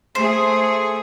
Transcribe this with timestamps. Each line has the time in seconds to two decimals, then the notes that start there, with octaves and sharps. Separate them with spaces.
0.15 A3 G#4 C5